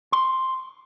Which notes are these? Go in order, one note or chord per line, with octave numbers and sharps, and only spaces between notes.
C6